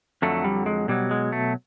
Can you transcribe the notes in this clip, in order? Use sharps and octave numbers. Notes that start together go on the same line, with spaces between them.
F2 D3 F#3 A3
G3
G#3
B2 F#3 G3
G#3
A3